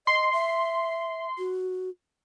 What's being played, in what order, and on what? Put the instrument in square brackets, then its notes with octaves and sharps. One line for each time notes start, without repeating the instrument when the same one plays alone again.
[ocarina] D#5 [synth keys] C6
[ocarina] E5
F#4